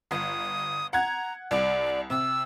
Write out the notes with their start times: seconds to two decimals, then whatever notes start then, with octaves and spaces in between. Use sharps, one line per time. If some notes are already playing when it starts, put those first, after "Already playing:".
0.11 G1 D#6
0.93 F#5 A#5 G#6
1.51 C2 D5
2.10 C3 E6